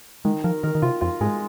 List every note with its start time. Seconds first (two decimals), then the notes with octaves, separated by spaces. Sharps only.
0.25 D#3 G#3
0.44 F3 A#4
0.63 D#3 A#4
0.75 D#3
0.82 C3 F4
1.01 F2 F4
1.21 G#2 G#3